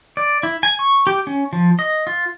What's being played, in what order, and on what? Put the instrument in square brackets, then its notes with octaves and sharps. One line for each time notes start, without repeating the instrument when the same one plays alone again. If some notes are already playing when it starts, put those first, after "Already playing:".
[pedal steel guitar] D5
E4
G#5
C#6
G4
C#4
F3
D#5
F4